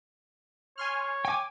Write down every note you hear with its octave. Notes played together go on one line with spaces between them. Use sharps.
C#5 G#5 C6 F6
G5 G#5 D6